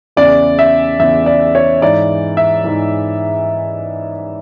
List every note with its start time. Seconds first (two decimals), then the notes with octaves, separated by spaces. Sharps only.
0.16 E2 C#3 E3 D5
0.59 E5
0.99 E2 C#3 E3 E5
1.26 D5
1.55 C#5
1.82 G#2 E3 D5
2.37 E5
2.64 G#2 E3